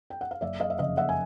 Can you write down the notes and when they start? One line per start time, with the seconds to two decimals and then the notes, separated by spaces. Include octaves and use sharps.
0.10 G5
0.21 F#5
0.31 F5
0.41 F#1 D5 E5
0.60 D#5 F5
0.70 E5
0.79 F2 C#3 D#5 F5
0.97 E5 F#5
1.09 G#5